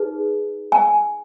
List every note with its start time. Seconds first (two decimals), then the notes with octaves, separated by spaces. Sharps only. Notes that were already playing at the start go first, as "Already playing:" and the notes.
Already playing: D#4 G#4 B4
0.72 G#5